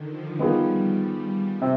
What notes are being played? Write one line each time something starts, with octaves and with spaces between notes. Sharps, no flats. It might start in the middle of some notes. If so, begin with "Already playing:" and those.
Already playing: D3 D#3
F3
D#3 G3 B3 F4 G#4
C3 C4